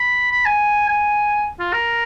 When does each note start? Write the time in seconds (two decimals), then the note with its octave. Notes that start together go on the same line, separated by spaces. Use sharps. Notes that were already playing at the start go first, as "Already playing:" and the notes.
Already playing: B5
0.32 B5
0.45 G#5
0.88 G#5
1.59 F4
1.73 A#4